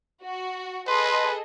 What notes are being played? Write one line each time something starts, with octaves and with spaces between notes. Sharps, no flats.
F#4
G#4 A4 B4 D#5 C6